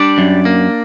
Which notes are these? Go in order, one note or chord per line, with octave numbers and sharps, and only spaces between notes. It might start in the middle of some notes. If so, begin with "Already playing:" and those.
Already playing: G3 D4 D5
F#2
A#3